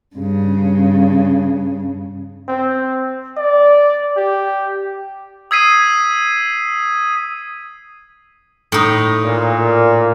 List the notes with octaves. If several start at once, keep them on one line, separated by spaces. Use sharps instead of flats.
G2 C#3
C4
D5
G4
D#6 E6 G#6 B6 C7 D#7
A2 D#4
A#2